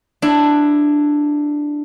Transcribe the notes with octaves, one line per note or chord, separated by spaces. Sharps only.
D4 E4